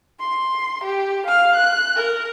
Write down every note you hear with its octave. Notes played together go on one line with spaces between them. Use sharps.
C6
G4
F5 F6
F#6
A#4